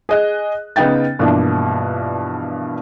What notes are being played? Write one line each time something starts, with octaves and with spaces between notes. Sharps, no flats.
G#4 D#5 F#6
C#3 B3 D#4 G5 A6
G2 B2 E3 F3 A#3 D4